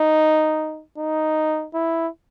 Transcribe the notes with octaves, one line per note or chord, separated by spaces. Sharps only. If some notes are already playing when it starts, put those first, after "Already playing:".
Already playing: D#4
D#4
E4